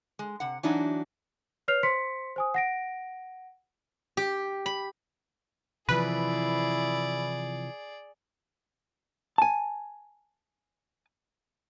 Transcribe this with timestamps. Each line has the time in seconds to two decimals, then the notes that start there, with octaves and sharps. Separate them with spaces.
0.19 G#3
0.40 C3 F#5
0.63 E3 F#3 D4 D#4 F#4
1.68 B4 C#5 F6 C7 F7
1.83 C5 C6 B6 C#7
2.36 C5 G#5 D#6
2.54 F#5 A#6 D7
4.17 G4
4.66 B5
5.89 C3 E3 F3 E4 G#4 B4 D5
9.38 G#5 A5